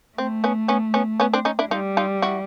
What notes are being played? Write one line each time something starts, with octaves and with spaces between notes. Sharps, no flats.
A3 C4
B3 C#4
B3 C#4
B3 C#4
B3 C#4
C4 D4
C#4 D#4
D4 E4
G3 D#4 F4
D#4 F4
E4 F#4